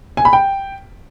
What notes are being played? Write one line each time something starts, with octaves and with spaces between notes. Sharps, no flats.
G#5
B5
G5